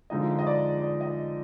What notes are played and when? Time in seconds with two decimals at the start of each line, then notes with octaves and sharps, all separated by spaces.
0.10 D3 F3 G#3 D#4 D#5
0.39 D#5
0.47 D5
0.82 D5
1.01 D#5